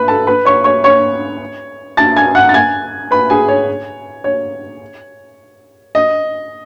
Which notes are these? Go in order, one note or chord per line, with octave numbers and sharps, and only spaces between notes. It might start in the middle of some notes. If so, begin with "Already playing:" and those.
Already playing: B4 B5
A4 A5
B4 B5
C#5 C#6
C#5 C#6
C#5 C#6
A5 A6
G#5 G#6
F#5 F#6
A6
G#5 G#6
B4 B5
G#4 G#5
C#5
C#5
D#5